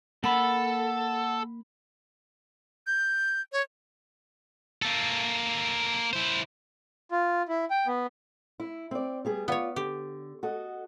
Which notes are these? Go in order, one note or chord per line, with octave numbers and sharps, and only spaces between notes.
A#3 A4 F#5 B5
G6
C#5
A#3 A4
E4 C5
F4
E4
G5
B3
E4
C4 D5
G3 B3 G#4
B3 F4 C#5 D5
D3 G4
F#4 A4 D#5